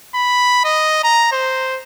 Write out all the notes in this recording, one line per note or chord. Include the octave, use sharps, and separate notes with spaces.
B5
D#5
A#5
C5